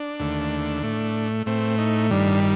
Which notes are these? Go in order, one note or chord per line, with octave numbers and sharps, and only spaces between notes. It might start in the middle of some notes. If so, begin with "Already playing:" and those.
Already playing: D4
D#2 D3 A3
A2 A3
A2 A3 C4
D#4
G2 D#3 G3 D4